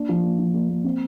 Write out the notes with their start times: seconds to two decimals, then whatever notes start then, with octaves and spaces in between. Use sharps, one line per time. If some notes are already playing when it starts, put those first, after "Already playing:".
Already playing: A#3 D4
0.09 F3
0.24 A#3
0.39 F3
0.54 A#3
0.69 A#3
0.84 C4